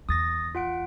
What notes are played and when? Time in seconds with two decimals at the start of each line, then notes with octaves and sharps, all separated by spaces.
0.09 E2 D#6 A6 A#6
0.55 F4 F#5 D7